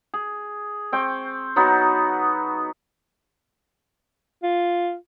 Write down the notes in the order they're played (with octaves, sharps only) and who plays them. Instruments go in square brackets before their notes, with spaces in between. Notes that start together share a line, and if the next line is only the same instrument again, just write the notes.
[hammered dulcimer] G#4
C4 G5 C#6
F#3 B3 D#4 F#4
[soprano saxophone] F4